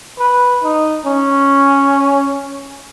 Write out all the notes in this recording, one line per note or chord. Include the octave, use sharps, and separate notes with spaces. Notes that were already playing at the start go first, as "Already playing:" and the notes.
B4
D#4
C#4